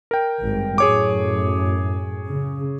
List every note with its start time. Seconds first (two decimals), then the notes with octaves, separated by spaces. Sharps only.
0.11 A#4 G5
0.41 G#1 G2
0.78 F#2 A2 G#4 C#5 D6
2.28 C#3